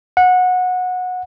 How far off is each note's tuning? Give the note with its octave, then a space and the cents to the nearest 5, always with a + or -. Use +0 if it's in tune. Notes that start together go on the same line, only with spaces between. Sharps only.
F#5 -20